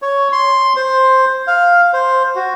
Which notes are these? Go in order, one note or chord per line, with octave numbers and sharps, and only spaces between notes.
C#5
C6
C5
F5
C5
F#4